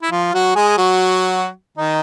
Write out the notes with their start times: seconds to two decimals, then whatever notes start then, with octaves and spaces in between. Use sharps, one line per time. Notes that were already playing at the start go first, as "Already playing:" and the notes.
0.02 E4
0.11 F3 F4
0.33 F#3 F#4
0.55 G#3 G#4
0.77 F#3 F#4
1.77 D#3 D#4